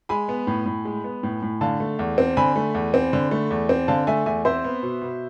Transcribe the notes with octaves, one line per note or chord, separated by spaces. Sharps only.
G#3 G#5 B5
B3
A2
A2
G#3
B3
A2
A2
D3 F5 A5
A3
E2
C4
D3 G#5 B5
A3
E2
C4
D3
A3
E2
C4
D3 F5 A5
A3 E5 G#5
E2 E5 G#5
C4 C5 E5
B3
B2
B2